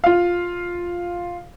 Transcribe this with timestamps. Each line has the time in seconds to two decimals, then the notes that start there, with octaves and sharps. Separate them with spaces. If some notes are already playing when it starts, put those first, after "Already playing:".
0.04 F4 F5